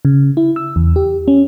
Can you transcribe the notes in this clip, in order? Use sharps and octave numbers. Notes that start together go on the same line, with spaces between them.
C#3
E4
E6
E2
G4
C#4